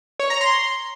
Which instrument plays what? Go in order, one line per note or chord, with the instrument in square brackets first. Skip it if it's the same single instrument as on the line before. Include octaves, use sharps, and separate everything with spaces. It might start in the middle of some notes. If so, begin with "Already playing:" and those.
[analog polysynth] C#5
A#5
C6